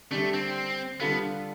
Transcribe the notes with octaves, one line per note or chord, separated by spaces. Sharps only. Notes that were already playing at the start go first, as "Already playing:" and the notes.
D3 G3 A3 D4 G4
C4
D3 G3 B3 D4 F4 A4